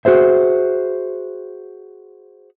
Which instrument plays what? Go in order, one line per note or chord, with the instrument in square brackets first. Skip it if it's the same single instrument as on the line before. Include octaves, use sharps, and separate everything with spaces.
[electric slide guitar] F#4 G#4 C5 E5